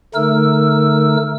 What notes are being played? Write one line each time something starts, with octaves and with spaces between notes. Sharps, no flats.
D3 A3 D#4 A#4 E6